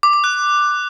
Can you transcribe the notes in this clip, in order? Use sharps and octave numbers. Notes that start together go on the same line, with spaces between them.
D6
D6
F#6